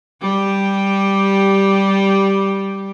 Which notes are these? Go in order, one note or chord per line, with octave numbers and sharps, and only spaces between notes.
G3 G4